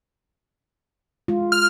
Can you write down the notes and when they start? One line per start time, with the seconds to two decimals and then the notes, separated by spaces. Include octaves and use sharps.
1.28 G#3 F4
1.52 F6